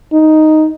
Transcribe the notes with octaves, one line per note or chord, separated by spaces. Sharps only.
D#4